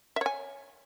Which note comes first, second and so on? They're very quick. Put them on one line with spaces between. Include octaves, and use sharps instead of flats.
E5 C#5 G#5